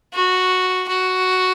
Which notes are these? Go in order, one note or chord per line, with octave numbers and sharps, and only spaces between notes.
F#4
F#4